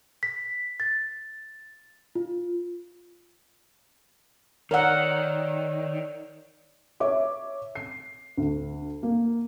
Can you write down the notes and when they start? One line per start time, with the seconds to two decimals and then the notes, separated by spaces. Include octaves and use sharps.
0.23 B6
0.80 A6
2.15 F4
4.71 D#3 A#4 C#5 D5 F#5 E6
7.00 C#5 E5 D6
7.75 C7
8.37 D2
9.03 A#3